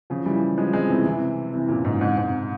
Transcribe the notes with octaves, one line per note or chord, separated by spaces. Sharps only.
C#3 F3
E3 G3
F3 G#3
G#3 C4
C3 E3
C3 E3
C3 E3
A#2 C#3
G#2 C3
G#2 C3
G#2 C3